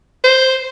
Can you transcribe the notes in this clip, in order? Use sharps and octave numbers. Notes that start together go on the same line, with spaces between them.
C5